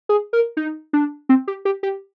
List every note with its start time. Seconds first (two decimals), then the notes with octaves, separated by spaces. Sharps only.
0.09 G#4
0.33 A#4
0.57 D#4
0.93 D4
1.29 C4
1.48 G4
1.65 G4
1.83 G4